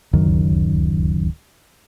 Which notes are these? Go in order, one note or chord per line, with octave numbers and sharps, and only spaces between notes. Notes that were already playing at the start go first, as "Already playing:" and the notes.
D1 C#2 F#2 D#3